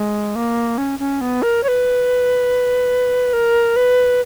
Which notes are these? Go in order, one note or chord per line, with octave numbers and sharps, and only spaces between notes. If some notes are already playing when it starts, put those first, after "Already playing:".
Already playing: G#3
A#3
C#4
C#4
B3
A#4
C#5
B4
A#4
B4